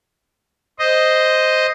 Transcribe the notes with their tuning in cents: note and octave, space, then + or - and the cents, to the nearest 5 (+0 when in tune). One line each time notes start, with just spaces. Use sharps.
C5 -5 D#5 +0